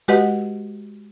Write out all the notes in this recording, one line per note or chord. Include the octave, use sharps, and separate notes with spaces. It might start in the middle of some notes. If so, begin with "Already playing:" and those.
G#3 F#4 G4 B4 D#5 F#5